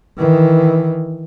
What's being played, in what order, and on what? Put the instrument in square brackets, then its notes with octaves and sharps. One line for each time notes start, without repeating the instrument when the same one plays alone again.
[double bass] D#3 E3